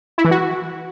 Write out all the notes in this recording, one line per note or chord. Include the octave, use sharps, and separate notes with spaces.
E4
E3
F#4